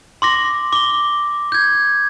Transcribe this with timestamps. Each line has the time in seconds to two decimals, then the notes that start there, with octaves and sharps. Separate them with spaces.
0.22 C6 D6 A#6
0.72 D6 G7
1.52 G6 G#6